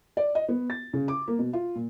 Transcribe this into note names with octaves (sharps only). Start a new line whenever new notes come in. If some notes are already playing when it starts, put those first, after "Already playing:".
D5
D#5
B3
A6
C#3
D6
A#3
B2
F4
A#2